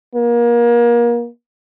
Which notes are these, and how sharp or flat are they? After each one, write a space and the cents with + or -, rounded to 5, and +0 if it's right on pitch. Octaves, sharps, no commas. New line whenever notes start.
A#3 +30